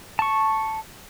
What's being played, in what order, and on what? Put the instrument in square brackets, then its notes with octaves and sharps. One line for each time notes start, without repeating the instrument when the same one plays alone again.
[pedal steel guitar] A5 C#6